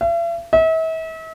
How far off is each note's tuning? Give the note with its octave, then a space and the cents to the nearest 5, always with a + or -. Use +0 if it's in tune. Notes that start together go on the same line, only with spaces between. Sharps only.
E5 +45
E5 -40